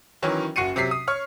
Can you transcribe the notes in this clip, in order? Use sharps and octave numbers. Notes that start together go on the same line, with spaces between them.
D#3 E3 F#3 C#4
F#1 F#4 C#6 C7 C#7 D#7
C3 F#3 B6 C7
D#6
C#5 C#6 F6